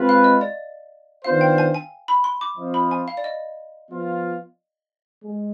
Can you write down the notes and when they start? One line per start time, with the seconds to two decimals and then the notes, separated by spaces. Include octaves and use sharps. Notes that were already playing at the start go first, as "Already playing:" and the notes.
Already playing: G#3 C4 F4 B4
0.09 F5
0.24 D#5
0.41 D5
1.24 D#3 B3 D4 F4 C5 F5
1.41 G5
1.58 G#5
1.74 G#5
2.08 B5
2.24 C6
2.41 D6
2.57 F3 C4 F4 C5 D#5
2.74 B5
2.91 G#5
3.08 F5
3.17 D5
3.24 D#5
3.91 F3 B3 F4
5.23 G#3